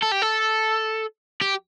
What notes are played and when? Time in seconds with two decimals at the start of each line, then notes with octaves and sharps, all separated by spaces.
0.02 A4
0.12 G4
0.22 A4
1.41 G4